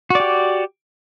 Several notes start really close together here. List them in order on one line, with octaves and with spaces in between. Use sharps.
F#4 D5 G4